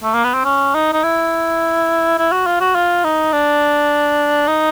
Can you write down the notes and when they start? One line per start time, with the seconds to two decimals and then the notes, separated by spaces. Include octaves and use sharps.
0.03 A3
0.14 A#3
0.24 B3
0.34 C4
0.45 C#4
0.75 D#4
0.93 D#4
1.03 E4
2.18 E4
2.32 F#4
2.47 F4
2.61 F#4
2.75 F4
3.04 D#4
3.33 D4
4.48 D#4